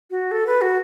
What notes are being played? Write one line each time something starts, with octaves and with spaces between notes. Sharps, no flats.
F#4
A4
B4
F#4